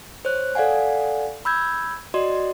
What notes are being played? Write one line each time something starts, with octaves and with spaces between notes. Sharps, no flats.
C5 C#5 F#6
A4 D5 F5 F#5 G#5
B5 E6 G6 G#6
F#4 D5 D#5 C6